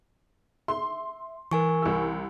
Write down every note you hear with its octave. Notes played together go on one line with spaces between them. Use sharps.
E5 C6
E3 A#4 G#5 C#6
C2 E6